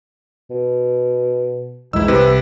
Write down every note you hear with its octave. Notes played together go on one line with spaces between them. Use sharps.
B2
A#1 E2 G#3 D#4 E4 E6
C2 C3 B4